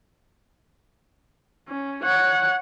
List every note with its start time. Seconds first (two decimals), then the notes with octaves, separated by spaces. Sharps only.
1.68 C#4
2.04 C#5 F#5